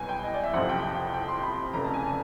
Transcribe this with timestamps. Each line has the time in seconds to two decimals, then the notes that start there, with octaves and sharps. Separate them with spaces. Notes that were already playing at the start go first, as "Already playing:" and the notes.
Already playing: C2 B2 F#3 G#5
0.09 G5
0.23 D#5
0.34 D5
0.44 E5
0.53 F#1 F2 C3 F3 F#5
0.69 G5
0.83 G5
1.14 G5
1.28 C6
1.43 B5
1.73 F1 F2 C#3 A#5
1.84 A5
1.94 G#5
2.04 A5